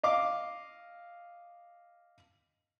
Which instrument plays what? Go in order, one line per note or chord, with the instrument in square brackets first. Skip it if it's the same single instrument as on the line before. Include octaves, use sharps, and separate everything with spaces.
[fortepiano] D#5 F5 D6